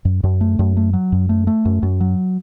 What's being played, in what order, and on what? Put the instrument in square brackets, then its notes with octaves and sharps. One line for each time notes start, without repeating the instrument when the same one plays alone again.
[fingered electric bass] F#2
F#2
A3
F#2
A3
F#3
F#2
A3
A3
F#2
F#2
F#3